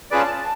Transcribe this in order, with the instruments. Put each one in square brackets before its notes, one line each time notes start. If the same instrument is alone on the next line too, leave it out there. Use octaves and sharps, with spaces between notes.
[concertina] C#4 F4 G#4 B4 D5 [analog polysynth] A5